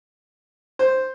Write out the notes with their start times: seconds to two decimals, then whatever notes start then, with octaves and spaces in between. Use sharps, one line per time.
0.79 C5